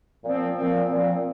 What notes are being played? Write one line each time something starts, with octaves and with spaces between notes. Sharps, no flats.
A#2 F3 C4
A#2 F3 C4
A#2 F3 C4